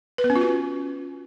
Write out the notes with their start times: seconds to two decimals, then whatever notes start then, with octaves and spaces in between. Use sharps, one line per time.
0.18 B4
0.24 B3
0.30 C#4
0.36 F4
0.41 F#4